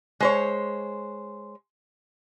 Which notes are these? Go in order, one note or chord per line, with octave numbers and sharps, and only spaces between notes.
G#3 C5 C#5